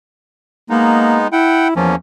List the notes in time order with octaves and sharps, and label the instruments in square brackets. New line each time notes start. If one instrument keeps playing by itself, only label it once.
[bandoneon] G#3 B3 D#4 [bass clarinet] A#3
[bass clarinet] E4 [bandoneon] F#5 G5
[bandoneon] E2 A#3 C#4 [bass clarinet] F3